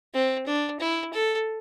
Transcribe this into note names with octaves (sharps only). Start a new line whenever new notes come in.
C4
D4
E4
A4